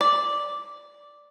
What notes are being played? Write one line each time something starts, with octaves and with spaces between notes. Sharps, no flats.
D5